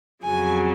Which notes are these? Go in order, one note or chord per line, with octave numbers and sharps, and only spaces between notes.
F2 C#3 F#3 G#5